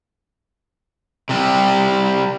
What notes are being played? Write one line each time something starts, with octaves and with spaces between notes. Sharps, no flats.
C3 G3